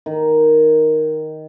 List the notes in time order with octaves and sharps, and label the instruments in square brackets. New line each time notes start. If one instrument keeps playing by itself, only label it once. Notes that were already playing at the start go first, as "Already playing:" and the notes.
[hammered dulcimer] D#3